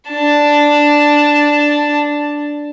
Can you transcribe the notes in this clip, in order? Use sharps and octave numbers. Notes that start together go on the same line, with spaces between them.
D4 A5